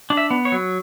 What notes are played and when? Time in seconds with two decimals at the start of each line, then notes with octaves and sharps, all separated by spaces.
0.10 D4
0.17 E5
0.31 B3
0.45 C#5
0.52 F#3